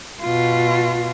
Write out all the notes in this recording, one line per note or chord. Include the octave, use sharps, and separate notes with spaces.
B2 F4